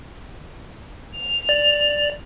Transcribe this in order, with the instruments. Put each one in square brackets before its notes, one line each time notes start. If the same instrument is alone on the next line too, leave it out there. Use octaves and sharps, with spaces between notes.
[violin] F7
[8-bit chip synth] D5